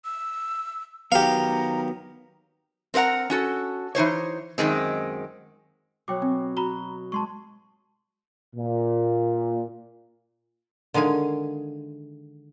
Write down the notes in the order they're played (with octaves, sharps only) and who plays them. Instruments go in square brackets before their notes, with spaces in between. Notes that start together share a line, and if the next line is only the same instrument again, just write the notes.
[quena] E6
[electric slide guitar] D#3 F#3 B3 [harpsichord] G4 F5 [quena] A#5
[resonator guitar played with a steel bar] C4 A#4 B4 F#5 A#5
C#4 F#4 A4
E3 D#4 C5 C#5
F#2 A#2 D#3 G#3 C4
[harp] B2 F#3 F#4 [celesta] C#5 G5 D6
[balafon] C4
[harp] F#4 [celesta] A#5 B5 G7
[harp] G#3 [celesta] A5 C6 C#6
[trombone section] A#2
[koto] D3 D#3 G#3 F5 G#5